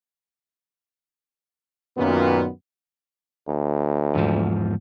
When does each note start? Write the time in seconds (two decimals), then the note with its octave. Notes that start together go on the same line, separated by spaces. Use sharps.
1.98 F#2 A#2 D#3 B3
3.49 D2
4.15 E2 G#2 F3